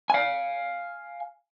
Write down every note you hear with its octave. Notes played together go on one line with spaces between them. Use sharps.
F5 G#5